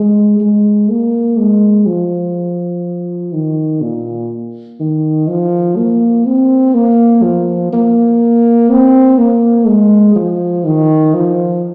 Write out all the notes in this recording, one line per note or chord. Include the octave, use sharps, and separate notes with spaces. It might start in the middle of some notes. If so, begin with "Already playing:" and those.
Already playing: G#3
G#3
A#3
G#3
F3
D#3
A#2
D#3
F3
A#3
C4
A#3
F3
A#3
C4
A#3
G#3
F3
D#3
F3